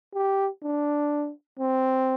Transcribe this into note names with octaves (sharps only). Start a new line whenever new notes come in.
G4
D4
C4